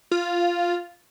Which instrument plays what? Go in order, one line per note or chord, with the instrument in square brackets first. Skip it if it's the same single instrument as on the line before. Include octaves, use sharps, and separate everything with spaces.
[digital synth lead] F4